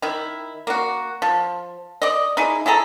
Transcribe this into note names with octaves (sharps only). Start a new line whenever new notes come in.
D#3 E4
A#3 F#4
F3
D5 D#5
D#4 E4 G#4
E4 G#4 A4 A#5